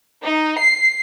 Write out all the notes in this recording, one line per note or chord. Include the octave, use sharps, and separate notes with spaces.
D#4
C7